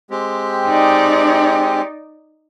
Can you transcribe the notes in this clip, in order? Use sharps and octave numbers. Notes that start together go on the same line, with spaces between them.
G#3 C4 G4
D#4 D5